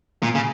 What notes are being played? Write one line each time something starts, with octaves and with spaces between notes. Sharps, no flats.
A#2
C#3